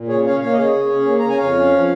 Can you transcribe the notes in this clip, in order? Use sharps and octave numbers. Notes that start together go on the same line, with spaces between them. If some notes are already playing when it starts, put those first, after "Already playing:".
Already playing: A#2
C#3 G#4 C#5
C#4 C#5 F5
A#3 C#5 F5
D#5
C#3 G#4 C#5
C#3
C#4
A#3
C#3 A#5
G#5
F2 C#5 F5
C#4
F3